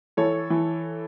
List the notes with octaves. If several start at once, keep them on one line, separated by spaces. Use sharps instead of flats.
E3 A4 C#5
E3